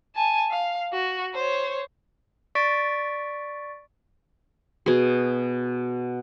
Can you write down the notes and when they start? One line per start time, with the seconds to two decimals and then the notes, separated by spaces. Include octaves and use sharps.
0.16 G#5 A5
0.51 F5
0.93 F#4
1.35 C5 C#5
2.55 D5 C#6 A6 B6 D7
4.86 B2 G#4